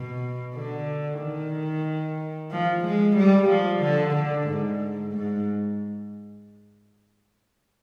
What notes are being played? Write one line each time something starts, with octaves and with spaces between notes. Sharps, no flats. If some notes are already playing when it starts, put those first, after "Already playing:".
Already playing: B2
D3
D#3
F3
G#3
G3
F3
D3
D3
G#2
G#2